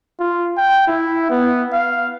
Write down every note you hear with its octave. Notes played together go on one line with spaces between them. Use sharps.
F4
G5
E4
B3
F5